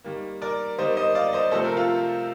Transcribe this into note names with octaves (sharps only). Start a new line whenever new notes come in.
D#3 G3 A#3
A#4 D5
D#3 G3 A#3 C5 D#5
C5 D#5
D5 F5
C5 D#5
C3 F3 A3 C4 A4 C5
A#4
F4 A4